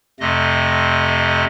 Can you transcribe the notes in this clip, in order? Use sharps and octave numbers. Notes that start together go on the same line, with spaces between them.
F2 C3 A3 D#5